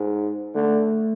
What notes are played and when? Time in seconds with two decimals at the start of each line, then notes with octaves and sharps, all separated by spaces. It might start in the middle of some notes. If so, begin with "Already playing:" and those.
Already playing: G#2
0.55 D3 A3